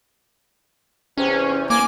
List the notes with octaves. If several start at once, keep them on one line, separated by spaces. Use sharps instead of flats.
E2 C3 C#4
A#3 G#5 D6